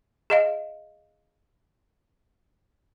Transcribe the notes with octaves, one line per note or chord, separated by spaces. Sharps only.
G#4 D#5 F5